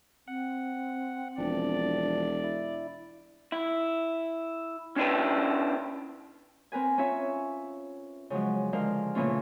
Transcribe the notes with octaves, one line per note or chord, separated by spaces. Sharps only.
C4 F#5
E1 F3 D4 D5
E4
E4
C#4 D4 E4 B4
C4 A#4 B4 G#5
C#4 F4 C#5 E5
C#3 F3 F#3 G#3
D3 F3 G#3 A#4 F5
A#2 C#3 E3 A3 C#4 F4